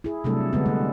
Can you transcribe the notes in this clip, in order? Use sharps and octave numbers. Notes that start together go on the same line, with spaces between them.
E4 G#4
C3 F#3 G3 A3 D4 A4
D3 G#3 B3
G3 A3